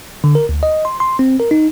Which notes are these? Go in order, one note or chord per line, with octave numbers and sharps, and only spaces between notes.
D3
A#4
D2
D#5
C6
C6
C4
A#4
D#4